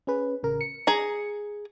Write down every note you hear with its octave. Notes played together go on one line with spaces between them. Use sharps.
C#4 G#4 B4
A1 C#3 A#4
C#7
G#4 A#5